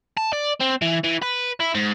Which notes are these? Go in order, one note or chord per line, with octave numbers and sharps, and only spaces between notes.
A5
D5
C4
E3
E3
B4
E4
G#2